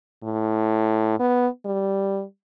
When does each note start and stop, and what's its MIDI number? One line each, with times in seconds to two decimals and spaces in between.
0.23 1.19 45
1.20 1.47 59
1.65 2.23 55